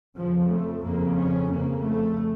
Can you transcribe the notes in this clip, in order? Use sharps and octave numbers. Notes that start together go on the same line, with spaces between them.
F2 C#3 F3
A3
F2 C#3 A#3
C#4
F2 C#3 A#3
A3